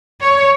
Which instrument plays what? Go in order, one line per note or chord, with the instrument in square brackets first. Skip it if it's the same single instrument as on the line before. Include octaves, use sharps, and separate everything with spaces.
[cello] C#5